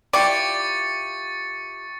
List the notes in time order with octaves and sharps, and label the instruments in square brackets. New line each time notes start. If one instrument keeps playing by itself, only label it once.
[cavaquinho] E4 F4 G4 [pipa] D5 [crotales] C#6 A6 C#7